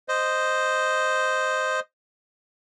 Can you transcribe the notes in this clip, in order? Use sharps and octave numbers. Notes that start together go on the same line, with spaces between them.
C5 D#5